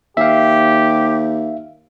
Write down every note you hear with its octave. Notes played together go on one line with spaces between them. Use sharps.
D#2 G4 E5 F5